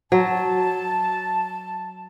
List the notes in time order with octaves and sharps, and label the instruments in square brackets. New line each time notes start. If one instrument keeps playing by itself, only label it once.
[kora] F#3 [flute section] A5